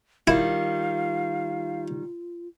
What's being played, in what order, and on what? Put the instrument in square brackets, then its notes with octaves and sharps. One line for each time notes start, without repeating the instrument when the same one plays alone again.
[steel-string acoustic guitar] D#3 G3 [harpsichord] E4 [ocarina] F4 [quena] F5